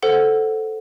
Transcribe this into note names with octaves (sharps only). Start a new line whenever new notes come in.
A4 C5 F#5